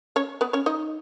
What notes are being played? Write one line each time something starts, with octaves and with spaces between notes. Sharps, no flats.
C#4 C#5
B3 B4
C#4 C#5
D#4 D#5